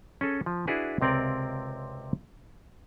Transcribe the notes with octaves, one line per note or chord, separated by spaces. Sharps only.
C#4 G#4 A4
F3
D4 E4 F#4 G#4 B4
C#2 C3 C4 A#4 D5